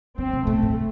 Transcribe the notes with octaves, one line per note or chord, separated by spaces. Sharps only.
D3 C4
C3
B2 A3
A2